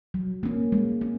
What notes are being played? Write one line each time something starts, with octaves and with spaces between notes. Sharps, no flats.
F#3
A#3 C#4
G#3
C#4